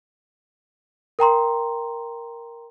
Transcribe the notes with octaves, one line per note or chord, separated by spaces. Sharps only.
A#4 G5 A#5 C6